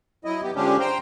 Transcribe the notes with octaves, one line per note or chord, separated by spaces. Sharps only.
F#3 E4 D#5
B3 G4
D3 F3 G#3 C#4 D4 G4
C5 G5 A#5 C6